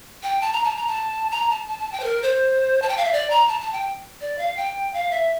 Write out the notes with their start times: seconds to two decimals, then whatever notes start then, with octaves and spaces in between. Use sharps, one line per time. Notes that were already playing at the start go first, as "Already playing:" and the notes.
0.23 G5
0.41 A5
0.53 A#5
0.64 A5
0.76 A#5
0.87 A5
1.31 A#5
1.50 A5
1.67 A5
1.79 A5
1.92 G5
2.00 C5
2.04 A#4
2.23 C5
2.82 A5
2.89 G5
2.97 F5
3.05 E5
3.13 D5
3.30 A#5
3.48 A5
3.60 A5
3.72 G5
4.21 D5
4.39 F5
4.57 G5
4.94 F5
5.11 E5